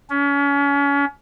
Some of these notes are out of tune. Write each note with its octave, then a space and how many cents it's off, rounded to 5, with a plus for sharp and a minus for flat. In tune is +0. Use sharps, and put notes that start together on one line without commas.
C#4 +35